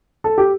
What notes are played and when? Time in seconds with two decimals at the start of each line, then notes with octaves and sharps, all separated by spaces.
0.24 A4
0.38 G4